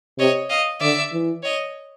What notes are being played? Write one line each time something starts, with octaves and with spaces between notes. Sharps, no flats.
C3 C#5 D#5
D#5 F5
D3 D5 E5
E3
C#5 D#5